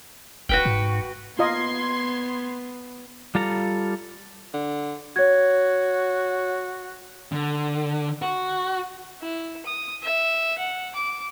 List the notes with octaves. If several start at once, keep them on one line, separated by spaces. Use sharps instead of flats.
F1 F#4 B4 G5
G#2
B3 F4 D#5 C6 G#6 C7
G3 F4 A4 A#5
D3
F#4 C#5 G#6
D3
F#4
E4
D#6
E5
F#5
D6